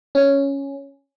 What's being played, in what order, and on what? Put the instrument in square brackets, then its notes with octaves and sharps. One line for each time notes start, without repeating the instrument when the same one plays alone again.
[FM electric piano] C#4